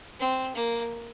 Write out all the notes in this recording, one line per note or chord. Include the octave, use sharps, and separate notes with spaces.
C4
A#3